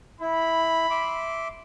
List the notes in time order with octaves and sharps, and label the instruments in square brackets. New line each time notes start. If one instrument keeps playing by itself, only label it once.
[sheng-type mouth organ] E4 [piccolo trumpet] B5
[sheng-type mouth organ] E5 C6 D6